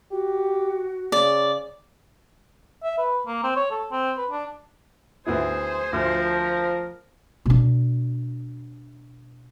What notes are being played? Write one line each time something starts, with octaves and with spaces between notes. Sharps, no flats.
F#4 G4
C#3 D5
E5
B4
A#3
C4
C#5
A4
C4
B4
D4
D2 B3 E4 G#4 C5
D2 F3 A#4
B2 D4